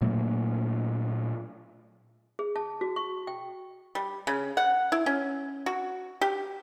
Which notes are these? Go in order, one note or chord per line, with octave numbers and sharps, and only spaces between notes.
A#2 F#3 A3 A#3
G#4
A5
F#4
C#6
G5
G3
C#3
F#5
E4
C#4
F#4
G4